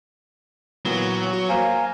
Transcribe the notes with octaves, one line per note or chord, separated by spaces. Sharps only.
A#2 E3 F#3 B3
F#4
A#3 C5 F5 G#5 A#5